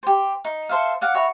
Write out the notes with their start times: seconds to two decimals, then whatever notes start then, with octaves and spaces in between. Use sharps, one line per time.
0.03 G4 C5
0.45 D#4
0.69 A4 C5 E5 F5
1.01 D5 F5 F#5
1.15 F#4 C#5 E5 B5